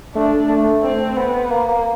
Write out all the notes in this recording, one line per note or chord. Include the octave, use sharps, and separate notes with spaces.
A3 D4
A3
C4
B3
A#3